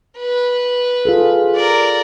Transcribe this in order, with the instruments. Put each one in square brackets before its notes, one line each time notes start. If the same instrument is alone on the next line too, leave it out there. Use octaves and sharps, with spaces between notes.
[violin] B4
[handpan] F4 G#4 A4
[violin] A#4 D5